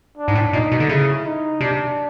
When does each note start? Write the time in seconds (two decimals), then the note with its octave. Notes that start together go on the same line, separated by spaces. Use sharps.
0.17 D4
0.28 G#2
0.35 A2
0.53 A#2 D#4
0.72 B2
0.80 D3
0.89 C#3 E4
1.25 D#4
1.61 C3 D4